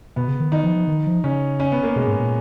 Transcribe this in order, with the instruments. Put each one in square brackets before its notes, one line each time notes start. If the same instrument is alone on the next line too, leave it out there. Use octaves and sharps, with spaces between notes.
[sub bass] B2 [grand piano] B3
[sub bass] C#3
D#3
[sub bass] D#3 [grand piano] D#4
[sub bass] F3
F3
D#3
F3
[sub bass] C#3 [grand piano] C#4
[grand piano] C#4
B3
A#3
[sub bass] B2 [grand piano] G#3
[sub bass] G#2
A#2